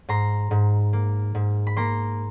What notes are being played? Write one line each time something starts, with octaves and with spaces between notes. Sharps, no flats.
G#2 A#5 C6
G#2
A#3
G#2
B5
A#3 A#5 C6